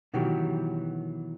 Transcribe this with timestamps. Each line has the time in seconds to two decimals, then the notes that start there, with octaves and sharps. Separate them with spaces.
0.14 B2 D#3 E3 F#3 G4